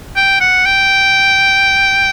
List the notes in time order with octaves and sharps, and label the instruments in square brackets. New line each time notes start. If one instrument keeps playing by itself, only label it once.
[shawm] G5
F#5
G5